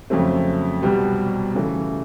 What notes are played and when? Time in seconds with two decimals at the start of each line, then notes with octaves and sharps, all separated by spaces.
0.10 F2 C#3 F#3 A3 C4
0.82 C2 B2 G3 B3
1.55 C#3 E3 A3